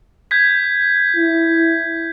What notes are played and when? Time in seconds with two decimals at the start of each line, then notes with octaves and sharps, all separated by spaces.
0.31 G6 G#6 B6
1.16 E4